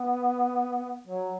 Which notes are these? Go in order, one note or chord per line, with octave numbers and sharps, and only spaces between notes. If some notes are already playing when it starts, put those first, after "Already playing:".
Already playing: B3
F#3